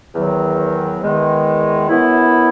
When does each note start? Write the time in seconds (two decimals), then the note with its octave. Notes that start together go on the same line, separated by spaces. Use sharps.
0.15 E2 D#3 F#3
1.02 E2 D#3 G#3
1.89 F#2 E3 B3 E4